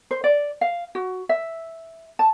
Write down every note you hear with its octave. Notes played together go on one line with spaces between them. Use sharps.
C5
D5
F5
F#4
E5
A5